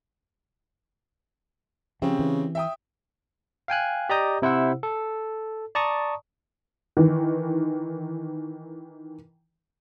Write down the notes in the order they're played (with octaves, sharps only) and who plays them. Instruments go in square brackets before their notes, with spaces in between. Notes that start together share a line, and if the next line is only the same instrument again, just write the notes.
[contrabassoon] C#3 [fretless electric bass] F3 [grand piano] C4 G4
[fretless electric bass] E3
[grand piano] E5 G5 D#6
[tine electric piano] F5 G5 G#5 F#6
G4 D5 D#5 A#5 D#6 G6
C3 E4 C5 F#5 E6
A4
D5 A5 A#5 C#6 D#6
[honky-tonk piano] D#3 E3